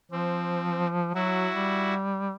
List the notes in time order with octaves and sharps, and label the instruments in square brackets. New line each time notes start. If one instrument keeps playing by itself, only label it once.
[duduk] F3 [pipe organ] C4
[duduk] F#3 [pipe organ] E4 F#4
[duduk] G3